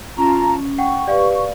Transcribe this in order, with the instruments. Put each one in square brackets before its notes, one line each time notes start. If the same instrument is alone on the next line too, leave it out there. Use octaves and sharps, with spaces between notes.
[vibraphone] C#4 [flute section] F4 A5 A#5
[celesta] F#5 G5 [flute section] C#6
[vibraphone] G4 B4 [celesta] D5 F5